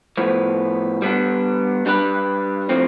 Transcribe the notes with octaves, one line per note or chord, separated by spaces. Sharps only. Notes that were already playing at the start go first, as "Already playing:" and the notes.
A2 F3 B3
G3 B3 D4
G3 D4 G4 B4
A2 F3 C4